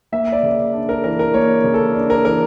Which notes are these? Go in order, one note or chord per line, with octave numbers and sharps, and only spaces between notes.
A#3 E5
D5
C#3
D4
A#4
E3 A#4
A#4
A#3 C#5
C#3
A4
D4
A#4
E3 A#4